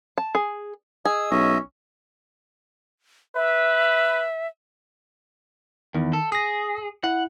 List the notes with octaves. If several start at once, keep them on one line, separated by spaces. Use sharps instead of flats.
A5
G#4
G#4 D#5 E6
B1 C#4 D#5 E5
B4 E5
E2 D#3
A4
G#4 D#6 A#6
E4 F#5